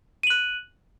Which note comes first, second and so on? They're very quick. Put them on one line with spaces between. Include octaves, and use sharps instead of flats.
D#7 F#7 F#6